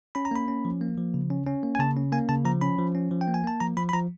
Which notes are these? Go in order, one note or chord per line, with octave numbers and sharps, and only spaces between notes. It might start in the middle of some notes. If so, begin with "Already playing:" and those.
C#4 B5
A#5
A#3 B5
C#4
F3
A#3
F3
C#3
C#4
C#4
A#3
G#5
C#3 A5
C#4
A#3 G#5
C#3 A5
F3 A#5
C#4 B5
F3
C#4
F3
G5
A#3
G#5
A#3 A5
F3 A#5
F3 B5
B5
F3 A#5